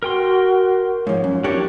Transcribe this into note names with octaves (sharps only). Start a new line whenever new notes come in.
F#4 A#4 G5 C6
G#2 F3 C#5
F#2 C#4
F#3 A#3 D4 E4 G4 C#5